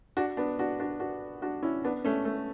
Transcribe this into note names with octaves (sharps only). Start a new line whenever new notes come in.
D4 F#4
B3 D4
D4 F#4
D4 F#4
D4 F#4
D4 F#4
C#4 E4
B3 D4
A3 C#4
A3